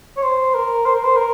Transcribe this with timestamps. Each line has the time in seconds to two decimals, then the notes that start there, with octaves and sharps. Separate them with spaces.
0.17 C#5
0.23 C5
0.54 A#4
0.85 C5
0.95 A#4
1.04 C5
1.16 A#4